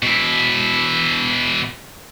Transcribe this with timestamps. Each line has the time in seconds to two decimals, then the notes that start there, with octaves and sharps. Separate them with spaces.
0.03 B2 E4